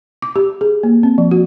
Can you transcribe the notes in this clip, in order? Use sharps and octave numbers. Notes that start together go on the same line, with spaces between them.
D6
G4
G#4
A#3
C4
F3
F#4